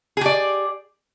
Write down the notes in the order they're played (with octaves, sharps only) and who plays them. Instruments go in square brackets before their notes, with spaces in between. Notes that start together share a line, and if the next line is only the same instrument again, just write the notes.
[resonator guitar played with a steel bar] G#4
G4
D5